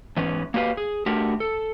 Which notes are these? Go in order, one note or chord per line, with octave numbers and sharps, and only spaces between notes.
G#2 E3 B3 C#4
A#3 F#4 G4 B4 F5
G#4
A3 D4 F#4 G4 A#4
A4